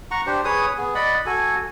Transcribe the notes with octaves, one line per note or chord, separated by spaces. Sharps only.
F#5 A#5 C#6
D4 G4 C5
G#4 B4 C#5 D#6
B3 G#4
D5 D#5 F#5 B5
F#4 A4 G#5